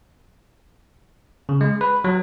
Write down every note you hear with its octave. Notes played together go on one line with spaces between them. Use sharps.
C#3
G#3
B4
F#3